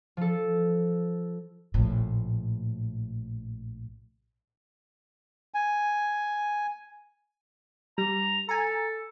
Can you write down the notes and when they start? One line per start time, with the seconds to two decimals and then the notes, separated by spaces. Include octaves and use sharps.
0.17 F3 A4
1.74 A#1 A2
5.54 G#5
7.98 G3 A#5
8.49 A4 G#5 A#5